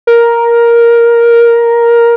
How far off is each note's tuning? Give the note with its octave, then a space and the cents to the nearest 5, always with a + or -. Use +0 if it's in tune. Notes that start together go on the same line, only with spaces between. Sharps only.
A#4 +10